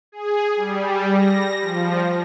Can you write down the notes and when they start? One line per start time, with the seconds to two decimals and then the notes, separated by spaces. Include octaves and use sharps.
0.12 G#4
0.56 G3
1.13 A#6
1.61 F3